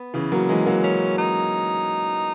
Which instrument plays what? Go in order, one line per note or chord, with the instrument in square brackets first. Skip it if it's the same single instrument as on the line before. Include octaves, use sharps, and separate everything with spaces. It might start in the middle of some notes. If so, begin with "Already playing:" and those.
Already playing: [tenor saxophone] B3
[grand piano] C#3 E3
F#3 A#3
E3 G#3
F#3 A#3
[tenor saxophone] C#4
D#4